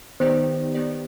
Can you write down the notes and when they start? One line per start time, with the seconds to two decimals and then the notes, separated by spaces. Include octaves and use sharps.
0.20 D#3 B3 D#4 G4 C5 D5
0.74 D#3 B3 D#4 G4 D5